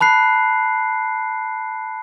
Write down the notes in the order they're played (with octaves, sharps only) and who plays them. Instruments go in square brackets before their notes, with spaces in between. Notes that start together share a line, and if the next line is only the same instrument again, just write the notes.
[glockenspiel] A5 B5 F#6 C7